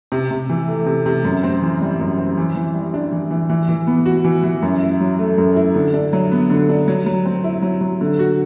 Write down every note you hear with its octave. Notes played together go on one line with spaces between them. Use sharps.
C3
C3
E3
A3
C3
C3
F#2
C4
E3
G3
F#2
C4
E3
E3
G3
D4
E3
E3
E3
E3
B3
F#4
E3
E3
F#2
E4
F#3
A3
F#2
E4
D3
D4
F#3
B3
D3
D4
F#3
F#3
C4
E4
F#3
F#3
D3
F#4